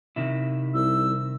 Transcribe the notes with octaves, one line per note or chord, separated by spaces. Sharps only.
C3 D#3 E4
C2 E6